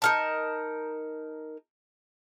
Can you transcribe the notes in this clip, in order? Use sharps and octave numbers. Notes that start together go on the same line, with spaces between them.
D#4 A#4 A5